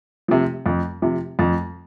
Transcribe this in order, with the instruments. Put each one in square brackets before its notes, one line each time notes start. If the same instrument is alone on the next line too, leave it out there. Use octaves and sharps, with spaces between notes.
[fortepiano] C3 F3
F2
C3 F3
F2